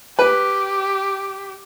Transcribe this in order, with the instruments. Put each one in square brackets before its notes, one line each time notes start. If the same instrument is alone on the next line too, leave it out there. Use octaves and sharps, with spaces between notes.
[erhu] G4 [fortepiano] B4